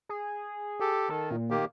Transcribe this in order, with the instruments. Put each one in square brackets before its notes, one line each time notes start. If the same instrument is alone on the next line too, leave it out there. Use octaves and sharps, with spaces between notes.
[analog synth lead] G#4
[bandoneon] G4 A4
[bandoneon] D#3 [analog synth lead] A4
[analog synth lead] A#2
[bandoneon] D#3 A#3 G4